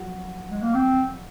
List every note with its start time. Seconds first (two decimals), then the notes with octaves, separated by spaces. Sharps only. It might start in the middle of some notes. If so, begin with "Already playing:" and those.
Already playing: F3 F#3 F4 F#4
0.50 G#3
0.62 A#3
0.74 C4